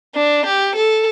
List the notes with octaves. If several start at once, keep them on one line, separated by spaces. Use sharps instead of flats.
D4
G4
A4